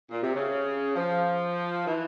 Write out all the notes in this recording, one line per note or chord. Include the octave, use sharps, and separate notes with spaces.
A#2
C3
C#3
F3
E3